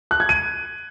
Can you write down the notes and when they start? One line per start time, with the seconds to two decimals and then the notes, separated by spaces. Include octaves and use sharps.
0.11 F#6
0.20 G#6
0.29 D#7